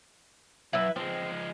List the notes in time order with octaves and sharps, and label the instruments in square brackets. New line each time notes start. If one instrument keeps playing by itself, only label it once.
[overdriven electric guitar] F#2 [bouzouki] E4 B4 E5
[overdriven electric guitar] F3 G#3 [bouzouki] C4